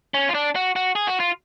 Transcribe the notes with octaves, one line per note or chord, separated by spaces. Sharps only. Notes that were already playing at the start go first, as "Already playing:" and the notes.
C#4
F4
D4
F#4
F#4
G#4
F#4
F4